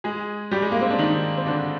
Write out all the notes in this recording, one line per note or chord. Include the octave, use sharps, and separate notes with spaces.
G#3 G#4
G3 G4
G#3
A#3
C4
D4
D#3 D#4
C4
D3 D4